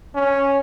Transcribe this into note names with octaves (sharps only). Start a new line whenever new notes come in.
C#4